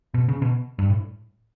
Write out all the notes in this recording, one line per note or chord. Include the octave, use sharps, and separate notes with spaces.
B2
C#3
B2
G2
A2